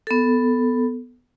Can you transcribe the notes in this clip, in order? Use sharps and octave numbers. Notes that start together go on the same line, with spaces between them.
B3 A4